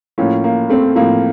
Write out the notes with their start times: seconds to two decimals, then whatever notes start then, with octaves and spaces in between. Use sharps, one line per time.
0.18 A2 F3 A#3 C#4
0.44 A#3
0.70 A3 C4
0.96 A2 F3 A#3